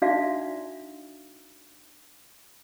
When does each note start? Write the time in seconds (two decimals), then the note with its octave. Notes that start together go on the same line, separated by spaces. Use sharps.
0.02 D4 D#4 F#4 D5 E5 F5